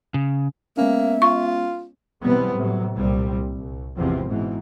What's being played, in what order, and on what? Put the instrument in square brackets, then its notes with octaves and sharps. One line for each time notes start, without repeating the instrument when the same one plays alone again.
[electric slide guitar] C#3
[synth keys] G#3 B3 C#4 [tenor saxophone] A#3 [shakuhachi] E5
[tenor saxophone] F4 [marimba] C#6
[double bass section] B2 E3 F#3 G3 B3 C4
A2 C3 F#3
C2 A#2 G3 C4
C2
G#1 E2 C3 F3 C4
G#2 B2 E3